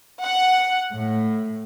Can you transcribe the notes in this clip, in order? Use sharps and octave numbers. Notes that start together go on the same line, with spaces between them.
F#5
A2